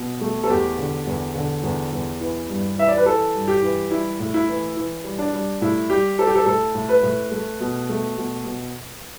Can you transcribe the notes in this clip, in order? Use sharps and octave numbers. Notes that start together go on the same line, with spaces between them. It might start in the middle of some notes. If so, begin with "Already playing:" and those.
Already playing: B2
A3
A4
E2 G4
D3
E2
D3
E2
E2
E3
G2
E3 E5
D5
B4
E3 A4
G2
G4
E3
G3 E4
A2
E4
E3
E3
G3
D4
G3
A2 E4
G3 G4
G3 A4
G4
A4
A2 A4
A2
B4
A2
A3
B2
A3
B2
B2